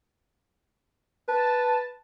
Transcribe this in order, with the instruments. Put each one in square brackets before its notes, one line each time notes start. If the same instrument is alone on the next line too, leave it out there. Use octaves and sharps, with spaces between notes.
[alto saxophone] B4 [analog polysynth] A5